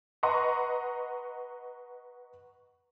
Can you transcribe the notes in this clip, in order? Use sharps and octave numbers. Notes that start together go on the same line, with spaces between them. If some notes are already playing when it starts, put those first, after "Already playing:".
B4 D#5 F#5 A#5 C6 C#6